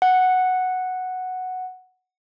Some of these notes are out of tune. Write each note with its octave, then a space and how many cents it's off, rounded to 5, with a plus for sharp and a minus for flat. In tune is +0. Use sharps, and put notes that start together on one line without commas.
F#5 +0